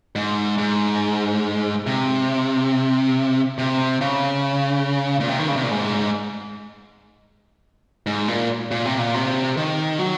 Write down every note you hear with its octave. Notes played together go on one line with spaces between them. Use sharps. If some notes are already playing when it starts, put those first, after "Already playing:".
G#2
G#2
C3
C3
C#3
A#2
C3
D#3
C#3
C3
A#2
G#2
G#2
A#2
A#2
C3
A#2
C3
D#3
F#3